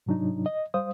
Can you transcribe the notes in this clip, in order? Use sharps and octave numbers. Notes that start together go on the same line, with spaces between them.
G#2 C3 F#3 D4 D#4
D#5
G3 C5 F5 D#6